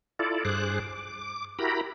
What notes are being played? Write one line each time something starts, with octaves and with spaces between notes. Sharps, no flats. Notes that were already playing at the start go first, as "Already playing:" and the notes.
E4 F4 A4 D5
G2 G#4 C5 D6 F#6
D6
E4 F#4 G4 A#4 A#5 B5